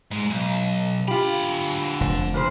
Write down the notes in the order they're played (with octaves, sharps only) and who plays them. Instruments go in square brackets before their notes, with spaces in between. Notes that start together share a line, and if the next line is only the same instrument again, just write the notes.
[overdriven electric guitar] G#2 G#3
B1
[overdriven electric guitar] D3 B5 [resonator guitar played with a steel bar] F4 G4
[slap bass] F1
[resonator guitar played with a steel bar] A#2 B4 C5